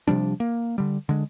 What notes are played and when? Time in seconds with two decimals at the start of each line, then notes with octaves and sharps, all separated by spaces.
0.08 C3 F3 G3 D4
0.40 A#3
0.78 D3 G3
1.09 D3 G#3